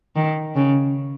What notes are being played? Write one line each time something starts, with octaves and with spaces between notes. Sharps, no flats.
D#3
C#3